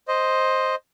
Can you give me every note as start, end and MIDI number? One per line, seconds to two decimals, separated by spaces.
0.08 0.75 72
0.08 0.75 75